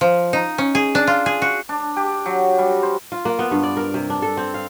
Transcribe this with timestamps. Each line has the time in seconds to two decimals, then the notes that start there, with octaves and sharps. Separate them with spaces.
0.01 F3
0.33 D#4
0.58 C#4
0.75 G#4
0.95 D4
1.07 F4
1.26 G#4
1.42 F#4
1.69 D4
1.96 G4
2.26 F#3
2.58 G3
2.83 C5
3.12 F4
3.25 A#3
3.39 B3
3.51 G2
3.63 D5
3.77 A#4
3.94 C3
4.10 D4
4.22 A4
4.37 C4
4.54 F5